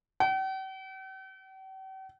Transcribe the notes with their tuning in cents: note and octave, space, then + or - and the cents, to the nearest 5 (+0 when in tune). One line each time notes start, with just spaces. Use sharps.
G5 -45